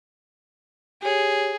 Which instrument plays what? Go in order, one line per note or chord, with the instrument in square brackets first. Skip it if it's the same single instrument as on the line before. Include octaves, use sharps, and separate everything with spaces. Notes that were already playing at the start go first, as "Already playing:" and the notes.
[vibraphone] G4 C#5 [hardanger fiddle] G#4